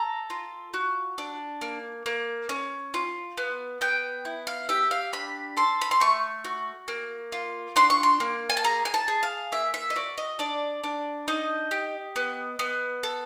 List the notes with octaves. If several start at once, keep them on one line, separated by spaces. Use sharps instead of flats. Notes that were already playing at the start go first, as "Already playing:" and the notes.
Already playing: A4 A#5
F4
F#4
D4
A#3
A#3
C#4
F4
B3
B3 G5
E4
F5
G4 E5
F5
D4 B5
A4 C6
B5
C6
A3 C#6
F#4
A#3
F4
D4 C6
C#6
C6
A#3
G#5
A5
G#4 A#5
G#5
A5
G#4
F5
A#3 E5
E5
D#5
F#4 D5
D#5
D4 D5
D4
D#4 D#5
G4
B3
B3
A4